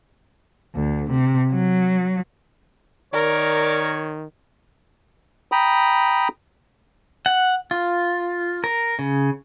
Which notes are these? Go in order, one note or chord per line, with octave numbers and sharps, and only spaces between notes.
D2
C3
F#3
D#3 A#4 C#5 D5
G5 A#5 B5 D#6
F#5
F4
A#4
C#3